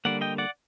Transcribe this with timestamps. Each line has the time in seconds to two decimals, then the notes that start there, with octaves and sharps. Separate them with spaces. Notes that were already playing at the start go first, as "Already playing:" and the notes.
0.05 D3 G3 A#3 D5 F#5
0.21 D#5 G5
0.38 D5 F#5